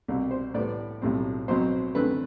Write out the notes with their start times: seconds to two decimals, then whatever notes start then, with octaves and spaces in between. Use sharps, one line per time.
0.08 C2 B2 G3 C4
0.31 C5
0.54 A2 G3 B3 D5
1.02 B1 A2 G3 C4
1.48 B1 B2 F#3 C4 C5
1.95 F#2 D3 A3 C4 B4